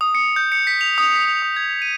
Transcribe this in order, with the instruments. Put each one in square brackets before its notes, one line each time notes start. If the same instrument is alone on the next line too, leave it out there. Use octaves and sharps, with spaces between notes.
[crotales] D#6
C#7
G6
C#7
B6
F7
D#6
B6
D#6
G#6
D#7